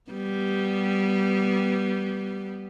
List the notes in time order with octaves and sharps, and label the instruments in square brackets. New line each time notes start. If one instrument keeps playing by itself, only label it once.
[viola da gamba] G3 B3